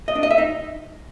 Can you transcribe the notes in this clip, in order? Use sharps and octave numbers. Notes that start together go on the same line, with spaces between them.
D#5
D4
D#5
E5
D#4